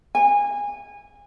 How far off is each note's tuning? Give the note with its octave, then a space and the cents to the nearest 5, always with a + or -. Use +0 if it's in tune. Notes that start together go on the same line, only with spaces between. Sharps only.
G#5 -25